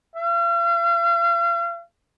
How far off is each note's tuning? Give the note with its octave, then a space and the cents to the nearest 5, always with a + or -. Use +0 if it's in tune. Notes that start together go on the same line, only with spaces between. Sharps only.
F5 -40